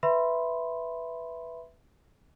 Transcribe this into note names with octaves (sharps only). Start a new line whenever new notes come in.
B4 E5 B5 C6